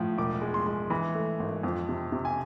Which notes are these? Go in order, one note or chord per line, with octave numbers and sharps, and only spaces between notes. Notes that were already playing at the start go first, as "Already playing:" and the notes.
Already playing: A2 F3
E1 D6
G#3
C6
G#3
E3 B5
A3
G#1
F2
C3
C3
G#5